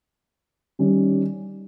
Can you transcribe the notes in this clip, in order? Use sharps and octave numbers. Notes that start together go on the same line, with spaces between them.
D#3 G3 C#4